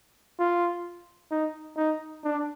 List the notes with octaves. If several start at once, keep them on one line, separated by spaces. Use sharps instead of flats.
F4
D#4
D#4
D4